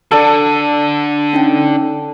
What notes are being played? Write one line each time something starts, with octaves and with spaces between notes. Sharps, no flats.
D3 D4 A4 D5
C#4 D#4 G5